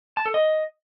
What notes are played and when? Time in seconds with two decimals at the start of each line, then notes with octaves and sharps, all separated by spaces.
0.17 A5
0.26 A4
0.34 D#5